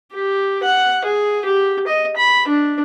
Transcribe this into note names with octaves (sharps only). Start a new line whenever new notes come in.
G4
F#5
G#4
G4
D#5
B5
D4